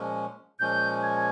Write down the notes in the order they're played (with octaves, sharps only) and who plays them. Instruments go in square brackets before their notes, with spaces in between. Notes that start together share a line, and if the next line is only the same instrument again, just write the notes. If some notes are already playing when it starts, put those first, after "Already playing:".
Already playing: [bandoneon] A#2 F3 G#3 C#4
[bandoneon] A#2 F3 G#3 C#4 [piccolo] G6
[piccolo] G#6